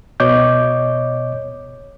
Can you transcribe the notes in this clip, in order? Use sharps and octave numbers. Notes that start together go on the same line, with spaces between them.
B2 C#5 D#5 D6 G6